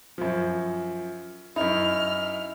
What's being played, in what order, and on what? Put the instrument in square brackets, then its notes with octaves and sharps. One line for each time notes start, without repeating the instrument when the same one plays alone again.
[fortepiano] F#2 F3
[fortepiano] F#2 D#4 [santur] E4 [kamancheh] F6